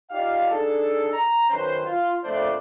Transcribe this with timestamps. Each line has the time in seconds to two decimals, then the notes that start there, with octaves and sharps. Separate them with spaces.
0.10 D#4 F4 G4 D5 F5
0.50 D4 D#4 G#4 A4
1.12 A#5
1.50 F#2 D#3 C#4 B4 C5
1.85 F4
2.24 F2 A#2 A3 D4 C5 D5